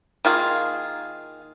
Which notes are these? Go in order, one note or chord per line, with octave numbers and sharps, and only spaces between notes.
D#3 A#3 F4 G#4